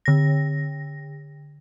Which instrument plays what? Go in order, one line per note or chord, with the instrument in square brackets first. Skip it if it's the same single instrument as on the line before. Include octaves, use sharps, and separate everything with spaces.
[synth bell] D3 A#6